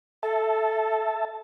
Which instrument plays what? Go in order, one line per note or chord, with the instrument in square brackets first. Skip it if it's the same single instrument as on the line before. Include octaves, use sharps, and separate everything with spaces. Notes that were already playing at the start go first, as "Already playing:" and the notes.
[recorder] A4 [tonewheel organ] E5 A5